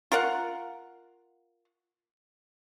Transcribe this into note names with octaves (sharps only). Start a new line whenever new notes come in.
F4 A#4 F5 F#5